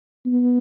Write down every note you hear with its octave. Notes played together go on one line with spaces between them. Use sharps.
B3